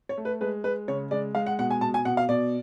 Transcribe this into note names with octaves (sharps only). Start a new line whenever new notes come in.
C#5
A3
B4
G#3 B4
G#3 B4
C#3 C#5
G#3 D5
G#3 F5
F#5
B2 F#5
G#5
B2 A5
G#5
B2 F#5
F5
B2 D5